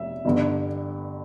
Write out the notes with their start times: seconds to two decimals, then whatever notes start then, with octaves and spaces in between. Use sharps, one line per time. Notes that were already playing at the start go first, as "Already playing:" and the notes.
Already playing: F1 E5
0.25 G1 G2 D3